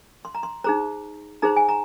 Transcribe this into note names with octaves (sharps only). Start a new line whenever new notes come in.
C6
A#5
C6
D#4 G#4 C5 A#5
D#4 G#4 C5 A#5
G#5
A#5